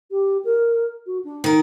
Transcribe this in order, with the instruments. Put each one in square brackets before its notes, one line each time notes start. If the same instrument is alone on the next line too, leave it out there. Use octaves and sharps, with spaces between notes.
[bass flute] G4
A#4
F#4
D4
[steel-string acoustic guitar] D#3 A#4